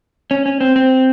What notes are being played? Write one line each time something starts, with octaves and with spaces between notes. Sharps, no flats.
C#4
C#4
C4
C4